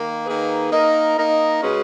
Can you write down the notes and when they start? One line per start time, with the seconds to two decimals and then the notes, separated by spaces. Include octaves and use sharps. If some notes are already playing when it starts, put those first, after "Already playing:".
Already playing: D#3 A#3
0.26 D#3 A#3 D#4 G#4 B4
0.71 A#3 D#4 A#4 D#5
1.17 A#3 D#4 A#4 D#5
1.62 C#3 G#3 C#4 F#4 B4